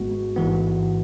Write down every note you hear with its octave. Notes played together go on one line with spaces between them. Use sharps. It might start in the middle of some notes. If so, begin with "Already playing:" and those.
Already playing: G#1 G#2 G#3 B3 F#4
A1 G#2 E3 B3